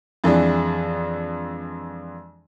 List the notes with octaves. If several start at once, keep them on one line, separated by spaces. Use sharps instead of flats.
F2 E3 G#3 D4